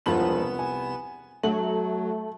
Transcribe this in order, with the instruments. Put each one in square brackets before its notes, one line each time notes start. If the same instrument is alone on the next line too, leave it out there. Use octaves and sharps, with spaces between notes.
[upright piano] E1 F3 F#7 [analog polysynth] C2 B3 E7
[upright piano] G#5
[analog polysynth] F#3 [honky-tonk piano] A3 [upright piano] F#7